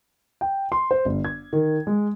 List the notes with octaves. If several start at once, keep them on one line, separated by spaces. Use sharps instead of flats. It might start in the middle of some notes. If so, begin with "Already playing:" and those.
G5
C6
C5
G1
G#6
D#3
G#3